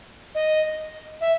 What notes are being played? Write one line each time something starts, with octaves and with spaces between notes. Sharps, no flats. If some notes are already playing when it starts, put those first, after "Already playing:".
D#5
E5